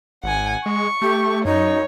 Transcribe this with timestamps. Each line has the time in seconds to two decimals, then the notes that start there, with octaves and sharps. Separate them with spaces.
0.23 G#1 F#5 G#5
0.66 G#3 C#6
1.02 A3 G4
1.45 F#2 D#4 C#5